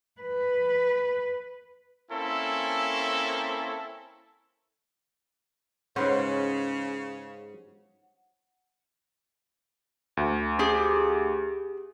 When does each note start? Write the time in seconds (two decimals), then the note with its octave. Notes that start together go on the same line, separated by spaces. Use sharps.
0.21 B4
2.11 A#3 C4 C#4 E4 A4
5.96 G#2 C#3 C#4 B4 C5 F#5
10.17 D2
10.59 G4 G#4